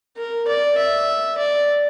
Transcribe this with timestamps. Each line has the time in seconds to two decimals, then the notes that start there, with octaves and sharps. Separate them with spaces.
0.17 A#4
0.48 D5
0.78 E5
1.38 D5